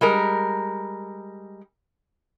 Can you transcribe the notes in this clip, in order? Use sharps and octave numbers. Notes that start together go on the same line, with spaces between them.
G3 G#3 A#4